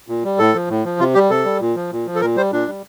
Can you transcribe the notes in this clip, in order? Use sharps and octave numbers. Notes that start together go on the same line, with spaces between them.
A#2
G3
A2 A4
F3
A2
F3
C3 F4
G3 G4
C3 A4
G3
A#2
F3
A#2
F3
A4
A#2 A#4
G3 C5
A#2 D4
G3